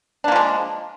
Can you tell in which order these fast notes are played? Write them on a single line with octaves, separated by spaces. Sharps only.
D4 A#3 F3 G#3